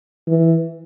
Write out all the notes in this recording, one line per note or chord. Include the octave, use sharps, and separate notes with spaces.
E3